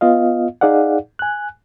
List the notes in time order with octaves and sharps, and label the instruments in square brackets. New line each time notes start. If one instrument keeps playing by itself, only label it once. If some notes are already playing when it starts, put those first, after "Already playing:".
[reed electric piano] B3 F4 D#5 F5
D#4 G#4 D5 F5 F#5
G#5 F#6